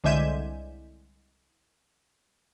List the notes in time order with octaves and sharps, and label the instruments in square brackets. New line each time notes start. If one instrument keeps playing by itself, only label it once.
[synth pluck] C2 D3 G#3 E5 G6 D#7